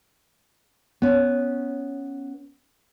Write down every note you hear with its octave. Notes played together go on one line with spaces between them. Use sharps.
B3 C#4